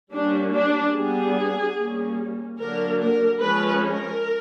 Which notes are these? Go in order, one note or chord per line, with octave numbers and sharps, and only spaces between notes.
G3 A#3 C#4 D4
D4
G3 B3 D4 G#4
G3 A#3 C#4
D3 F#3 A#3 D4 A#4
A#4
F3 G#3 C#4 B4
A#4